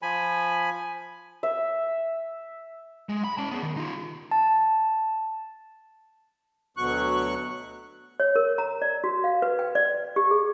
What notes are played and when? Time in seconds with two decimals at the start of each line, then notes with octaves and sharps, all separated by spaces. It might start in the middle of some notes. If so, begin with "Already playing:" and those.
0.02 F3 G#5 B5
1.43 E5
3.09 G#3
3.24 B5
3.38 C#4 A5
3.51 B3 G#4
3.63 D#3
3.77 D#4 F4
4.31 A5
6.77 D2 B2 F#3 C#6 F#6
8.20 C#5
8.36 A#4
8.58 A#5
8.82 D5
9.04 F#4
9.24 F5
9.42 B4
9.59 G5
9.75 D5
10.16 G4
10.31 G#4